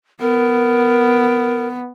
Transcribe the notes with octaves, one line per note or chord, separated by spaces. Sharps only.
B3 A#4